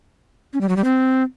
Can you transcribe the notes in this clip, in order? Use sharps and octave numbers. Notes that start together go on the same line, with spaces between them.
C#4
G3
F#3
G3
C4